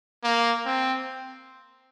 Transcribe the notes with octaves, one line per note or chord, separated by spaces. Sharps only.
A#3
C4